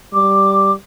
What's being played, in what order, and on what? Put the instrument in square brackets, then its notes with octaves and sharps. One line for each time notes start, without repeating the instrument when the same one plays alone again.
[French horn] G3 [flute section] D6